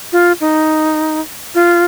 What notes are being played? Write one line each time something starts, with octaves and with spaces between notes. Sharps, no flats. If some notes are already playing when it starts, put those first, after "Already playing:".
F4
D#4
F4